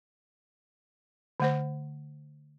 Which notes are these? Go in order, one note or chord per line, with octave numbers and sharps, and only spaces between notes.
D3 A3 C5